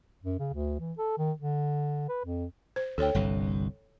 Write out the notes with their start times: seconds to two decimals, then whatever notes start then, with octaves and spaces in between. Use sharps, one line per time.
0.24 F#2
0.39 C#3
0.53 D2
0.80 E3
0.98 A4
1.18 D#3
1.38 D3
2.09 B4
2.25 F2
2.76 C5
2.98 D2 A4 C#5 G5
3.14 G1 C2 G2